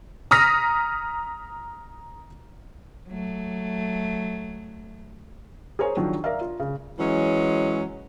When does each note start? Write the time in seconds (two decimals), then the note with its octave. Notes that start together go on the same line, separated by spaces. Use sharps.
0.31 A#5 D#6 F6 A#6 B6
3.08 F#3 A3
5.79 G#4 A#4 C5 C#5 G#5
5.97 D#3 F3 F#3 D4
6.24 A#4 D5 E5 F5
6.41 F4
6.60 C#3
6.99 E3 F#3 G#3 C#4